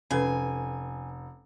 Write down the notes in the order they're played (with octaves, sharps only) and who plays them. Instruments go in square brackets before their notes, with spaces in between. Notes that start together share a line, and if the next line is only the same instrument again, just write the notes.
[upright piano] F1 [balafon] C#4 A4 B4 [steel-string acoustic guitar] G#5